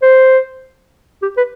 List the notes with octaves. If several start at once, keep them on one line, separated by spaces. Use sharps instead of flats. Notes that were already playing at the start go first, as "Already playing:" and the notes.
C5
G4
B4